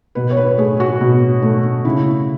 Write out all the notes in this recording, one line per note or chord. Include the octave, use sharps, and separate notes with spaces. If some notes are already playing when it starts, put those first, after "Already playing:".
B2 B4
C#5
B4
A3 G#4
F#4
B2
A3
C#3 E4